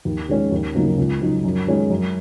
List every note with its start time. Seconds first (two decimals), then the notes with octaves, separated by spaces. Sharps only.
0.05 D#2
0.29 D#3 G#3 C#4
0.52 D#2
0.75 C#3 F#3 A#3 D#4
0.98 C#2
1.21 C#3 F#3 D#4
1.44 F#2
1.67 D#3 G#3 C#4
1.90 F#2